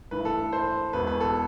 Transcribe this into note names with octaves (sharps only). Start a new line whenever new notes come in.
A1 G2 E3 B4
A4
C5
E1 E2 B2 B4
B4
A4